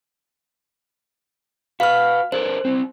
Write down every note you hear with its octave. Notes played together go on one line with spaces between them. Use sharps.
F#4 B4 F5 F6
D4 A4 A#4 C5
C4 E4